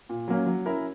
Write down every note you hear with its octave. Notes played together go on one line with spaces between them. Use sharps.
A#2
F#3 A#3 C#4
F#3
C#4 E4 A#4